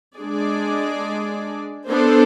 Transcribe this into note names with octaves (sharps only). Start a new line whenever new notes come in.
G#3 D4 G#4 D5
B3 D4 A4 C5